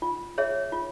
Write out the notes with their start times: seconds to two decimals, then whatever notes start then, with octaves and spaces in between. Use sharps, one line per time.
0.02 F4
0.38 G#4 C#5 E5
0.72 F4